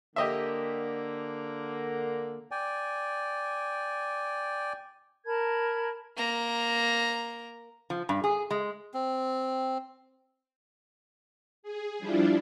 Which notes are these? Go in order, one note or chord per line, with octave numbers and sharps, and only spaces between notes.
D3 A#3 G4 D#5 E5
D5 G5 G#5
A#4 A5 B5 G#6
A#3 A#5
F3
G2
G#4
G#3
C4
G#4
F3 G3 D4 E4 F4